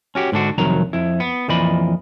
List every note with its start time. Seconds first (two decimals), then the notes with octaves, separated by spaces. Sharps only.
0.15 C#4 F#4 G4
0.32 G#2 D3 D4 F#4
0.58 C2 F2 D#3 F#3 A#5
0.93 F2 E4
1.20 B3
1.48 F2 A#2 E3 D5 D#5 B5